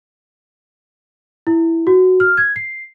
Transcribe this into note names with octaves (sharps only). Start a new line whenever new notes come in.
E4
F#4
F6
G#6
C7